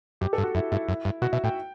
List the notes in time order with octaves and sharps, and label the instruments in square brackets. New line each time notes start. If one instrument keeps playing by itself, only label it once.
[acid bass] F#2 [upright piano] G4
[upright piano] A4
[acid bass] G2
[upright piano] F#4
[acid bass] F#2 [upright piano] E4
[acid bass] G2 [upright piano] E4
[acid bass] F#2
G2
[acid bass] B2 [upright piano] F#4
[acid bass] B2 [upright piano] E5
[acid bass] A2 [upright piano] G5